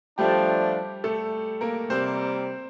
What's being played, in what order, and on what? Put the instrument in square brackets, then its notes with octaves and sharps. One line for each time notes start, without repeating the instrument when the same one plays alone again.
[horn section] F3 A3 D4 [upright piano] G3 G4
[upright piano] A3 A4
A#3 A#4
[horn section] C3 G3 A#3 [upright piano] C4 C5